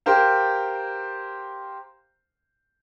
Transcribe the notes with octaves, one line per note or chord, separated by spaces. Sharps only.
G4 A#4 C5 F5